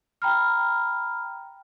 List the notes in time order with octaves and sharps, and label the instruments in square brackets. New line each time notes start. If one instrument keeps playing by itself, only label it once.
[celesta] G5 A#5 B5 F6